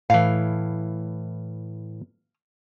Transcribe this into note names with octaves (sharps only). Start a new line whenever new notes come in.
A2 E3 F5